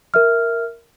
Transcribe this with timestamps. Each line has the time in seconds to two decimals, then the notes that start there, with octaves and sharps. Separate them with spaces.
0.14 A#4 E5 F6